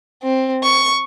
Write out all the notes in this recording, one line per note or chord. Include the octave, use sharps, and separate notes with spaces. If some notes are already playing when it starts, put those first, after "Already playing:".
C4
C#6